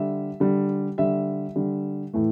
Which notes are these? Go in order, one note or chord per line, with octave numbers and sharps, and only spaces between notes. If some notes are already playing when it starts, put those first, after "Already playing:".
Already playing: D3 G3 E5
D3 G3
D3 G3 E5
D3 G3
A2 E3 A3